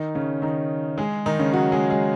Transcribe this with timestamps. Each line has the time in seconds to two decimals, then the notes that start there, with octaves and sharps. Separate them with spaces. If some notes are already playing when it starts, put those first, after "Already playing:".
Already playing: D#3 D#4
0.15 C#3 C#4
0.42 D#3 D#4
0.98 G#3 G#4
1.26 D#3 D#4
1.39 C#3 C#4
1.53 F#3 F#4
1.72 G#3 G#4
1.90 G#3 G#4